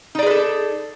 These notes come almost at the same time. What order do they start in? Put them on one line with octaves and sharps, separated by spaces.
D#4 D5 G#4 B4 A4